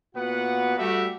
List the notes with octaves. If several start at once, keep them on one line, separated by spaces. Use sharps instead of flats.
A#2 B3 F#4 B4 F#5
G3 A3 F#4 G4 E5 F#5